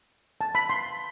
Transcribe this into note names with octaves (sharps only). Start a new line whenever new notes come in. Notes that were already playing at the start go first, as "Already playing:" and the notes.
A5
B5
C6